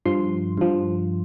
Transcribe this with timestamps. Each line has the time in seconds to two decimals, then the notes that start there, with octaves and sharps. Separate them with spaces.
0.05 G2 F3 C6
0.58 G2 F3